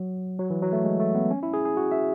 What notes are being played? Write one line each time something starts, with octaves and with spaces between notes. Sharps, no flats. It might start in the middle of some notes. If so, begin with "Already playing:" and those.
Already playing: F#3
F#3
E3
F#3
A3
G#3
A3
B3
C#4
E4
G#4
G#4
F#4
E5